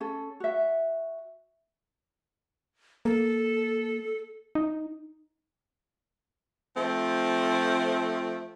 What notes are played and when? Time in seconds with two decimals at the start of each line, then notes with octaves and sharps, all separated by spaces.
0.01 C#4 A4
0.40 F#4 E5
3.05 A#3 A4
4.55 D#4
6.77 F3 A3 C4